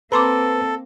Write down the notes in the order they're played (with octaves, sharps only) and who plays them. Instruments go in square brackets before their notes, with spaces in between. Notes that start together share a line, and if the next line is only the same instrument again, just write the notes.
[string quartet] A#3 C4 [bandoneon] A4 [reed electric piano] B4 [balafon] A#5 C6 D6